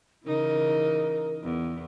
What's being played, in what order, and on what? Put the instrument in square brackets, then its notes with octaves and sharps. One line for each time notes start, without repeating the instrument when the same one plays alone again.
[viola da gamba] C#3 E3 D#4 [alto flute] A#4
[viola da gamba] E2